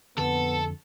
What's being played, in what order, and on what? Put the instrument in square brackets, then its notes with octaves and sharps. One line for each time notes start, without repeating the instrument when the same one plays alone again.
[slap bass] F2 D3 F3 [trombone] B3 [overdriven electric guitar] A4